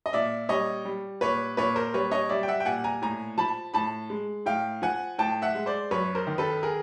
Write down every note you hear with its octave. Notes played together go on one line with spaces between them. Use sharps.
D#5
A#2 D5 E5
G3 C#5 D#5
G3
A#2 B4 C#5
A#2 B4 C#5
A#4 C5
G3 B4 C#5
C#5 D#5
G3 D5 E5
G5
E5 F#5
G5
A#2 F#5 G#5
G#5 A#5
A2 G#5 A#5
F3 A5 B5
A2 A5 B5
G#3
A2 F5 G5
F3 F#5 G#5
A2 G5 A5
E5 F#5
G#3
C5 D5
F#2 B4 C#5
A#4 C5
D#3
A4 B4
G#4 A#4